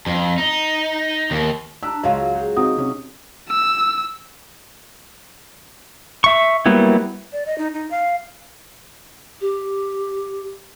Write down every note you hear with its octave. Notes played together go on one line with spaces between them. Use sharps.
F2
D#4
D#2
D4 A#5 E6 F#6 B6
C#2 F#3 G#3 F4 D#5 F5
F#4 G#4 C5
C4 D#4 F#4 D#6
C3 C#4
E6
E5 C#6
F#3 G3 A#3 B3 E4
D5
D#5
D#4
D#4
F5
G4